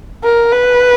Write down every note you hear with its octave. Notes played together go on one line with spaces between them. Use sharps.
A#4
B4